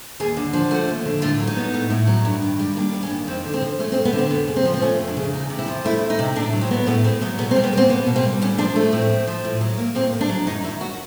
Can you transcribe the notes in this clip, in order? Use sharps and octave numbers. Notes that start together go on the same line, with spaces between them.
D#2 G#4
D3
F3
A3 F#4
D#2
D3
A2 F4
F#3
D#4
B3
A2
A2
F#3
G2
D#3
G3
A#3 D4
G2
C#4
D#3
F2 C4
D3
C4
F3
A3 C#4
C4
F2
B3
D3
C4
F2 B3
C#3
C4
F3
C4
A3 C#4
F2
D4
C#3
E2 D#4
C3
E4
F3
A3 E4
E2
D#4
C3
A2 D4
F#3
C4
B3
A2 B3
A2 C4
F#3 B3
B2 B3
C4
G3
B3
A#3 C4
B2 B3
B2
C4
G3
A2 C#4
F3 D4
A3
A2 C4
A2
F3
A2
F#3
A#3
A2 C4
A2
D4
F#3
F#2 D#4
D#3 E4
F#3 F#4